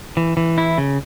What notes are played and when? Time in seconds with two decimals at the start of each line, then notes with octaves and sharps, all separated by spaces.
0.17 E3
0.37 E3
0.58 E4
0.78 C#3